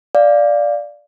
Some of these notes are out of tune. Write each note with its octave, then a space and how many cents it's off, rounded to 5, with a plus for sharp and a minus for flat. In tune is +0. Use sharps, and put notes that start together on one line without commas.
D5 +0 F5 +0